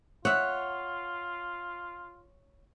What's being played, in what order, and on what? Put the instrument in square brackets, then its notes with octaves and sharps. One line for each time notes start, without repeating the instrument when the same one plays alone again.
[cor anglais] F4 [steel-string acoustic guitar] C#5 [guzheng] E5 F#5